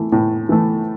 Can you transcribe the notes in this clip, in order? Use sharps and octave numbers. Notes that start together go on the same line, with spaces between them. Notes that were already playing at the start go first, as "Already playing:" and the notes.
Already playing: E3 A3
A2
E3 A3